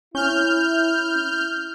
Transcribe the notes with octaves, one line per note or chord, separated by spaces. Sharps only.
C#4 E4 F6 G6